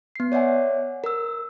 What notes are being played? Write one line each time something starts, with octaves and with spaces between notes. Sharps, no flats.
B3 C7
C#5 D5 E5 F#5 G#5
A#4 E6